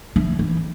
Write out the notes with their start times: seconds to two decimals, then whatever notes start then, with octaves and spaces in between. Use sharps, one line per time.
0.16 E3
0.39 E3